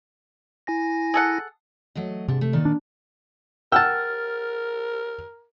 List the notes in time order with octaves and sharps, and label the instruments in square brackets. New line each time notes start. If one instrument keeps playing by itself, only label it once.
[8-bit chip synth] E4 G#5 A#6
[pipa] G#4 A4 F#5
[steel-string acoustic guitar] F#3 A3 D#5
[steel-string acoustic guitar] G#2 D4 [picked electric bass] C3
[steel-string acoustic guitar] A3
A#2 D#3 D5
[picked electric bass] D4
[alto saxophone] A#4 [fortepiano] F#5 E6 [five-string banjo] G5 A5 [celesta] F6 A6